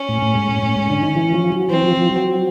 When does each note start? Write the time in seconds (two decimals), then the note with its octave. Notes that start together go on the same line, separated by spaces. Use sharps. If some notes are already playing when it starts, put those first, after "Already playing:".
Already playing: C#4
0.09 A2
0.22 A2
0.35 G#2
0.49 A2
0.63 A2
0.76 G#2
0.90 D3
1.03 D#3
1.16 E3
1.34 F3
1.52 F#3
1.70 E3 C4
1.84 F3
1.97 F3
2.11 F#3